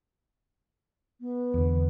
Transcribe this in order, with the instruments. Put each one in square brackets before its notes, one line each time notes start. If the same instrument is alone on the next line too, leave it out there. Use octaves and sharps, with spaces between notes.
[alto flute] B3
[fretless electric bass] E2 D3